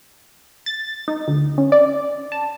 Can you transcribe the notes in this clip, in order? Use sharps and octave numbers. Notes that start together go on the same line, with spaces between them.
A6
D#4
D2
C#4
D5
A5